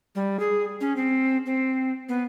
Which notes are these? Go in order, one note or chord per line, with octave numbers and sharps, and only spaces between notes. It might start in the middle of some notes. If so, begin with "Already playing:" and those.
G3
G#4
C#4
C4
C4
B3